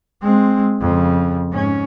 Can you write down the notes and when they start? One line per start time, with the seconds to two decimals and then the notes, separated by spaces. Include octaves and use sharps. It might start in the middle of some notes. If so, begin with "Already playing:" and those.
0.23 G#3 C4
0.81 F2 C#3
1.52 G#2 C#4